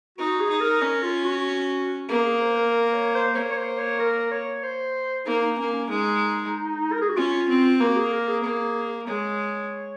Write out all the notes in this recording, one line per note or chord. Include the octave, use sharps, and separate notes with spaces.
D#4 F#4
G#4
D#4
A#4
C#4 A#4
F4
F#4
A#3 G#4
G#4
C5
A#4
A#4
C#5
C5
A#3 C#5
C#5
C5
C#5
A#4
C#5
C5
A#3 D#4
D#4
A#3 C#4
C#4
G#3 D#4
A#4
G#4
F#4
C#4 F4
C4
A#3 F#4
G#4
A#4
G#4
A#3
G#3 C#5